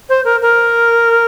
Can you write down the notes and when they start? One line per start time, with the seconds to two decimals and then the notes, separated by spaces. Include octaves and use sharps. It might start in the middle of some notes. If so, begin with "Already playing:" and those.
0.09 C5
0.25 A#4
0.42 A#4